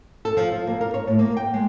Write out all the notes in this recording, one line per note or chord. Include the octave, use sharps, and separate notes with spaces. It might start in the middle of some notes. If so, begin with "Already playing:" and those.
A4
F3
F4
A#3
A#4
C#5
A2
A#3
G5
G#3